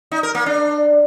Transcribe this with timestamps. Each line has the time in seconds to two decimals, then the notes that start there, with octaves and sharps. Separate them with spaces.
0.12 D#4
0.23 A#4
0.35 A#3
0.46 D4